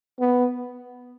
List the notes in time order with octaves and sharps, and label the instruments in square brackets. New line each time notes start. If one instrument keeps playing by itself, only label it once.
[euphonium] B3